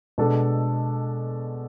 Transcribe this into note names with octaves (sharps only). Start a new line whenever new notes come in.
B2 G#3 D4 A4